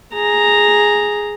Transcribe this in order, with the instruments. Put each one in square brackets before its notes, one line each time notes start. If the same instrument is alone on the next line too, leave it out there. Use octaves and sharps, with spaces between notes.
[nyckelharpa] G#4 A#5